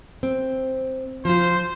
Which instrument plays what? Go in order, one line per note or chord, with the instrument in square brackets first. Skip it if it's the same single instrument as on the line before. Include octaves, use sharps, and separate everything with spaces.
[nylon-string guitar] C4
[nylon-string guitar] F3 F4 [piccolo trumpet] C5